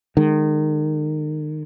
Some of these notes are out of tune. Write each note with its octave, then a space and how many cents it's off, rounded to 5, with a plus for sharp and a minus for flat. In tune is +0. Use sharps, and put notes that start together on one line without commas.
D#3 -30 G#3 -10